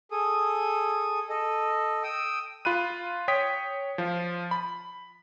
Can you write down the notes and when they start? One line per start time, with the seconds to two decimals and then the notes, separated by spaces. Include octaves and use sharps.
0.11 G#4 A4 D#6
1.29 A4 D#5
2.03 G5 D#6 E6
2.65 F4 B5 F#6 D#7
3.28 C#5 G5 D#6 B6
3.98 F3 F4
4.51 B5